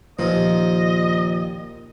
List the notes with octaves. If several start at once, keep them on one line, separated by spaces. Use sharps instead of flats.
D#2 A#2 F3 D#5